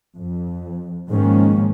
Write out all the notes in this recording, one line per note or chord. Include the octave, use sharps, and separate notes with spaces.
F2
G#2 D#3 F3 G#3 A#3 C#4